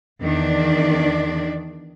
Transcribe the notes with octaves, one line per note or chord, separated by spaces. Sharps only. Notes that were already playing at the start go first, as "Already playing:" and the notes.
E2 D#3 D4 D5